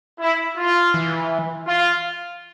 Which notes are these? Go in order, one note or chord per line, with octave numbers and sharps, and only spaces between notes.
E4
F4
E3
F4